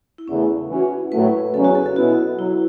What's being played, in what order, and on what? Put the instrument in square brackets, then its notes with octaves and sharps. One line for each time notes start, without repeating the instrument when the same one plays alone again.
[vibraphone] E4
[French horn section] E2 C#3 E3 A3 [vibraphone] C#4
[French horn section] E3 C#4 F#4
[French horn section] A2 F#3 A3 [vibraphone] B4
[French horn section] E2 C#3 F#3 C#4 [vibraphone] A4
[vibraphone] F#4
A4
A4
[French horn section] B2 B3 E4 [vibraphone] F#4
[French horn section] F#3 [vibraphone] E4